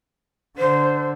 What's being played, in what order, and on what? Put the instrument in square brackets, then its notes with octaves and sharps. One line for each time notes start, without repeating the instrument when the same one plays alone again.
[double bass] D3 [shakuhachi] C5